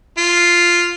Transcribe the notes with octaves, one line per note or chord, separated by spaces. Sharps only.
F4